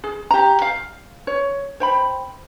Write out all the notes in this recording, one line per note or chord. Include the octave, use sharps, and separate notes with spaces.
G#4
G4 A#5
F5
C#5
C5 G5 B5